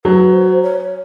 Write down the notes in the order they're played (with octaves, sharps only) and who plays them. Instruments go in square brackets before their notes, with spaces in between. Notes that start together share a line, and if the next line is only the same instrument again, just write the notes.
[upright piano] F#3 [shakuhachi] B4
[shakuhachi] C5
C#5